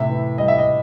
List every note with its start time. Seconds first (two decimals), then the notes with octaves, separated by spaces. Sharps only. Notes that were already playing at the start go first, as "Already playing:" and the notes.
Already playing: A2 C3 E5
0.09 E3
0.38 G3 D#5
0.48 E5
0.58 D#5